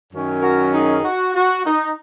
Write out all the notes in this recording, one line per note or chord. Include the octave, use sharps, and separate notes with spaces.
F#2 D#3 F#3 C#4
F#4 A#4
D#4 G#4
F#4
F#4
D#4